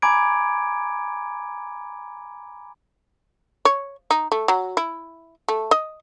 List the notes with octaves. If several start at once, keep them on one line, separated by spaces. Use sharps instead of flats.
G#5 A#5 B5 D6 G#6 D7
C#5
D#4
A3
F#3
E4
A3
D#5